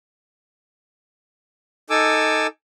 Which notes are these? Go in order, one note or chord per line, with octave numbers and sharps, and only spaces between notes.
D#4 A4 G#5 D6 E6